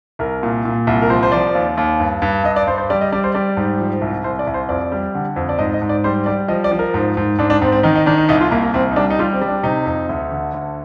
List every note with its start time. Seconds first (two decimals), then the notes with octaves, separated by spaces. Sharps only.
0.19 C2 A#4
0.43 A#2
0.65 A#2
0.87 C2
1.02 A#4
1.10 F3 C5
1.23 C5
1.32 F3 D5
1.55 D#2
1.77 D#2
2.00 G2
2.22 G2
2.44 G2 D#5
2.56 D5
2.67 G2 C5
2.78 C5
2.90 G3 D5
3.01 D#5
3.12 G3 D5
3.24 C5
3.34 G3 D5
3.57 G#2
3.79 F3
4.01 C2
4.24 C2 C5
4.39 D5
4.47 C2
4.54 C5
4.69 F2 D5
4.92 G3
5.15 D3
5.36 F2
5.49 D5
5.59 G#2 D#5
5.74 D#5
5.82 G#2
5.89 D5
6.04 G3 C5
6.26 G3 D5
6.48 F3 D#5
6.64 D5
6.72 F3
6.79 A#4
6.94 G#2
7.17 G#2
7.39 G#2 D4
7.50 D4
7.61 G#2 C4
7.72 C4
7.83 D#3 D#4
7.95 D#4
8.06 D#3 D4
8.18 D#4
8.29 C2 D#4
8.41 F4
8.51 C2 A#3
8.62 A#3
8.74 C2 C4
8.91 D#4
8.96 G3 D4
9.10 D#4
9.19 G3 F4
9.33 C4
9.41 G3
9.48 D4
9.63 C3 D#4
9.86 F2
10.09 D2
10.31 D3
10.54 D2